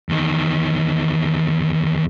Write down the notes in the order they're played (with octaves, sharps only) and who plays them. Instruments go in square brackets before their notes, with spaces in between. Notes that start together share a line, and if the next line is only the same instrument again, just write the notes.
[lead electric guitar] E2 D#3